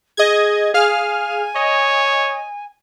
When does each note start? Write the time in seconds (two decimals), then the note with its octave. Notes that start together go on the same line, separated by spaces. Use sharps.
0.17 G#4 D#5 G#6
0.74 G#4 F5 G#5 F6
1.55 C#5 D#5